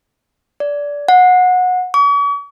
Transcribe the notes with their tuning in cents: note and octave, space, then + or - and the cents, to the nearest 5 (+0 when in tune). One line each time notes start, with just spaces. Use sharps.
D5 -20
F#5 -20
C#6 +45